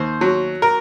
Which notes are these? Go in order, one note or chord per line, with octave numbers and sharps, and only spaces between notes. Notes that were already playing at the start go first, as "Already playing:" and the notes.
Already playing: D#2 C5
F#3
A#4